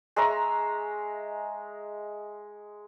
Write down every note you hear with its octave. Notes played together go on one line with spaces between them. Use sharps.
G#3 E5 A#5 C#6